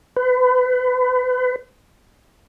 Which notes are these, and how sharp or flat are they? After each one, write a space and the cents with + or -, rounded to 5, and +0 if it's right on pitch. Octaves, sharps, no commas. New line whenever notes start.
B4 +35